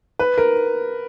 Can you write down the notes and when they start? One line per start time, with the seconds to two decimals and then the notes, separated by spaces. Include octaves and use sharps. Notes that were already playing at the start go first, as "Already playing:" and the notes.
0.19 B4
0.38 A#4